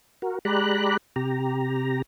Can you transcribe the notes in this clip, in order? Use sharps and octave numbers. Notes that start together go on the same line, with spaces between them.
F#4 A#4
G#3 G4 D5 A#5 B5 F#6
C3 G4 A#5